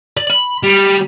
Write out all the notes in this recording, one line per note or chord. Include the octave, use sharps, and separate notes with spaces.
D5
B5
G3